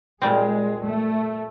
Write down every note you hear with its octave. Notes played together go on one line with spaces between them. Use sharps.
A#2 G3 G#3 C4
A3